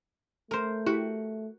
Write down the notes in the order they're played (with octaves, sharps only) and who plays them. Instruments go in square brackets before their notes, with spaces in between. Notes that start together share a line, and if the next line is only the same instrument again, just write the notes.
[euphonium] A3 [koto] A#4 C5
[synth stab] E4 G4 [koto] F#4